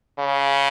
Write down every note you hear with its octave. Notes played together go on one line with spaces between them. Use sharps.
C#3